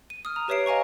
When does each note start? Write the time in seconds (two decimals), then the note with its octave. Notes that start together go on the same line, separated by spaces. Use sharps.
0.10 D#7
0.25 D#6 F6
0.36 A#5
0.48 G4 B4 C#5 E5 C7 D7
0.66 D#5 F5 G#5 A#5 C#6